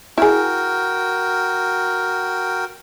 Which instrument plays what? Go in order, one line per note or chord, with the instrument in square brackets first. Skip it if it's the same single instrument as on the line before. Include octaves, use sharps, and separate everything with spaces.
[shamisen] E4 G#4 [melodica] F#4 A#4 G5